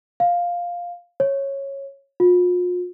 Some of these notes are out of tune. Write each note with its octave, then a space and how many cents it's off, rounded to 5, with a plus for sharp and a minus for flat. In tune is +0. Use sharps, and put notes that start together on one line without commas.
F5 +5
C#5 -10
F4 +40